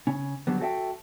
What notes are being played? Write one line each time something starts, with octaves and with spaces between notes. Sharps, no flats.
C#3 C#4
D3 F#3 G3 B3
F#4 G4 A4 D5 E5 G5